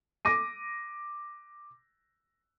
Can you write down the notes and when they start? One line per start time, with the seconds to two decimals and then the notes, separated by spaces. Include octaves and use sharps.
0.25 D6 A#6 D#7